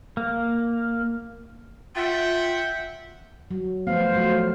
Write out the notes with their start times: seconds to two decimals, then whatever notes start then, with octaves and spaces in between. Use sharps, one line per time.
0.17 A#3
1.95 F4 E5 F#5 G5
3.51 F#3
3.87 F3 A3 B3 C5 F5
4.13 F3 F#3 A3